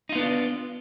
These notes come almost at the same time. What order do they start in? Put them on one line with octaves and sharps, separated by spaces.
D#4 F4 B3 D4